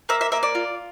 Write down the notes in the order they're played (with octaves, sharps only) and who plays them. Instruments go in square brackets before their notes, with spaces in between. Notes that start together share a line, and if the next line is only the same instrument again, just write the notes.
[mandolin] A#3 E5
E5
A#3 E5
D5
F4